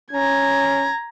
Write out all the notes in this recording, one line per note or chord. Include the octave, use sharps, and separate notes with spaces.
C#4 A#5 G#6